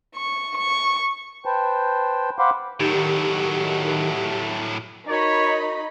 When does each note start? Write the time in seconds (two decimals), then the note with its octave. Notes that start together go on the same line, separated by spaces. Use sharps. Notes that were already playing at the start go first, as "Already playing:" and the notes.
0.15 C#6
0.57 C#6
1.46 B4 C5 G5 A5
2.39 C5 F5 F#5 B5 C6 D6
2.80 A2 D#3 F#3 G4
5.09 D#4 F#4 A#4 C#5 D#5 B5